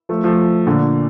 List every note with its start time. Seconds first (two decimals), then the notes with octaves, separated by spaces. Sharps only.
0.09 F3 A3
0.24 F3 A3
0.67 A#2 D3